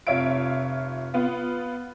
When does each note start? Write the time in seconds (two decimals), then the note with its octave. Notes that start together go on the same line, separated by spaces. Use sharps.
0.07 F1 F4 C#5 E5 F5 D7
1.14 B3 F4